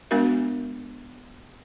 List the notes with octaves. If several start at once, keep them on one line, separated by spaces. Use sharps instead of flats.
G#3 B3 D4 F#4 A#4 E5